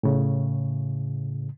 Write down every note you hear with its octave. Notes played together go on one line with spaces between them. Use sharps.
A2 C#3